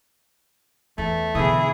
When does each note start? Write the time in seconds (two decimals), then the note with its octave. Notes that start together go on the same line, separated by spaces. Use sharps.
0.98 E2 A3
1.35 B2 D3 E3 E4 G#4 D#6